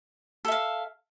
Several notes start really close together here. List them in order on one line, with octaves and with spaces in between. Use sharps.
A4 E5 F5